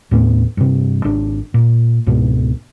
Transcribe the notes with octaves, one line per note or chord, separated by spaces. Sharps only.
D#2 A2 A3 B3
G2 C3
G#1 D4
A#2
C#2 G#2 B2 B3